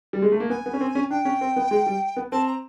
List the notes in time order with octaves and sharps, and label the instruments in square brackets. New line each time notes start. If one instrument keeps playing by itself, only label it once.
[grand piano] G3
G#3
A3
A#3
[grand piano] B3 [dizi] G#5
[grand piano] B3
C#4
C4
C#4
[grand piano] D4 [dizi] G5
[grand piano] C#4
C4
B3
G#3
G3
B3
[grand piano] C4 [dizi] A5
[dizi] A#5